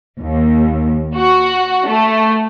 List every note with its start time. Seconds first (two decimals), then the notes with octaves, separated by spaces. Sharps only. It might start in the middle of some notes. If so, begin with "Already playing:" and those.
0.20 D#2
1.15 F#4
1.87 A3